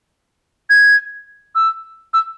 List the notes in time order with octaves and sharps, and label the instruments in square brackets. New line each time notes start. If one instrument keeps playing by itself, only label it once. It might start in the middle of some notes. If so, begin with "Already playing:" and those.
[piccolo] G#6
E6
E6